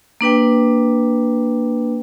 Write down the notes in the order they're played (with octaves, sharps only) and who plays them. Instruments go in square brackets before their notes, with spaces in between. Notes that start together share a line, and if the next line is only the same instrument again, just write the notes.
[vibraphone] A#3 D4 B4 G5